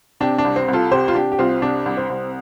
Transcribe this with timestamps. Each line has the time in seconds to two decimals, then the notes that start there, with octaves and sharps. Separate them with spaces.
0.20 C3 D4 G4
0.38 D4
0.44 C2
0.56 C4
0.68 C2
0.73 F4 A4
0.91 C3 G4 C5
1.08 F4
1.15 C3 D4 G4
1.32 G4
1.39 C2 C4 F4
1.62 C3 D4
1.86 C2
1.97 C4
2.10 C2